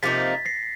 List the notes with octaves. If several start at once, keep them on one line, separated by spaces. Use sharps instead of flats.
C3 F3 A#3 D#4 A6 B6
A#6 C7